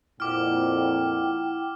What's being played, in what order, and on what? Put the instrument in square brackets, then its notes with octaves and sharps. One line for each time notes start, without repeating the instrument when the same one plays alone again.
[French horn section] F2 A#2 [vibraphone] E4 F#5 [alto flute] G5 [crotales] D6 F6